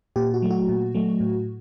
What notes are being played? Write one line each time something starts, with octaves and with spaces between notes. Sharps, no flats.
A#2 G4
F#4
F#3 A3
F#4
A#2
F#3 A3
A2